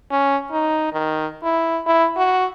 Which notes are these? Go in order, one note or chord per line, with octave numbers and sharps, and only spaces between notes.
C#4
D#4
D#3
E4
E4
F#4